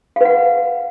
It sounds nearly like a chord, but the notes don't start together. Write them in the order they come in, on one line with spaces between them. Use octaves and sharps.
F5 B4 F#5